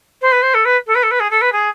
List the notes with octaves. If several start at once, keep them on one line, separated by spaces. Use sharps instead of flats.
C5
B4
C5
A4
B4
A4
B4
A4
B4
G#4
A4
B4
G#4